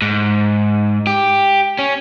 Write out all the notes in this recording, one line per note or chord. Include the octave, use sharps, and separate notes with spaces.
G#2
G4
C#4